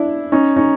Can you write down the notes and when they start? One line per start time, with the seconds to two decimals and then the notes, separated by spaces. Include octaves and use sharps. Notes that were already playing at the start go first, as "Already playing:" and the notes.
Already playing: D4 E4
0.32 C#4 D#4
0.56 C#4 D#4